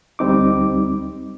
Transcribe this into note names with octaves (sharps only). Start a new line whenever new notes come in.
D2 G3 C4 D#4 D6